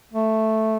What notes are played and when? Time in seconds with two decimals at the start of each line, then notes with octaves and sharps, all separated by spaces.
0.13 A3